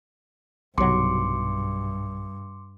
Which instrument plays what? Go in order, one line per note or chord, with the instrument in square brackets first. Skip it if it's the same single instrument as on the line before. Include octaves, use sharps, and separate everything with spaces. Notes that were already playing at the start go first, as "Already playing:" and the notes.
[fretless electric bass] B1 C3 F#3 [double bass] G2 [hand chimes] C6 D6 C#7